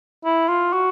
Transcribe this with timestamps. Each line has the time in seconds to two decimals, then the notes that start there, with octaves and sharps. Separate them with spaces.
0.25 E4
0.49 F4
0.73 F#4